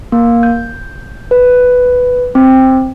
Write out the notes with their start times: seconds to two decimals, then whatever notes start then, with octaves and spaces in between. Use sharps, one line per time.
0.12 A#3
0.43 G6
1.31 B4
2.35 C4